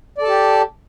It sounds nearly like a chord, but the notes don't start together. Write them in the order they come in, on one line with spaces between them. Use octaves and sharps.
D5 A4 A5 G4